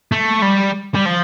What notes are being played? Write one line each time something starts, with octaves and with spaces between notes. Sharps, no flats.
A3
G3
G3
F3